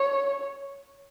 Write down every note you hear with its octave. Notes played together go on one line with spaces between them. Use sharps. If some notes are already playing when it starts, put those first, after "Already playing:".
Already playing: C#5